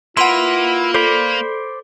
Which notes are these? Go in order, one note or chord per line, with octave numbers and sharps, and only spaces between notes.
A#3 E4 F4 B4 F#5 C6
A4 C5 D5 B5